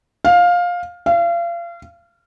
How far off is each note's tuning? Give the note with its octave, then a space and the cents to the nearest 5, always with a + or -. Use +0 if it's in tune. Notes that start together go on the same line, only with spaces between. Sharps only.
F5 +15
F5 -35